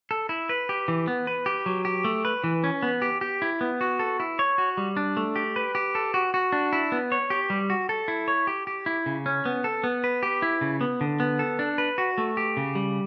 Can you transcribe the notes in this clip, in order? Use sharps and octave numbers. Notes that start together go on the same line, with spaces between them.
A4
E4
B4
G4
E3
B3
B4
G4
F#3
G4
A3
B4
E3
C#4
B3
G4
G4
E4
B3
F#4
A4
E4
C#5
F#4
G3
D4
A3
G4
B4
G4
A4
F#4
F#4
D4
E4
B3
C#5
G4
G3
F#4
A4
E4
C#5
G4
G4
E4
C#3
C#4
B3
A4
B3
B4
G4
E4
C#3
B3
D3
B3
A4
D4
B4
F#4
A3
G4
C#3
G3